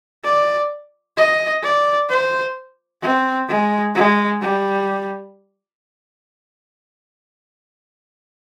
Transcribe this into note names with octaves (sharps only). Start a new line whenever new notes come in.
D5
D#5
D5
C5
C4
G#3
G#3
G3